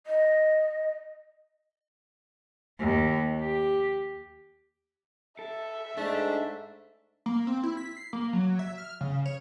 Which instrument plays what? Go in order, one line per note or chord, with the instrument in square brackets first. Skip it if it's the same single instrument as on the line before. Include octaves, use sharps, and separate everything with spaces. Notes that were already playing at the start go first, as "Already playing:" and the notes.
[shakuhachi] D#5
[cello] D#2
G4
[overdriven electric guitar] A4 [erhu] E5
[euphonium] G#2 [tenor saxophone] A3 [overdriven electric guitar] D4
[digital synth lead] A#3
C4
E4
B6
C7
A#3
F#3
E5
F6
C#3
C#5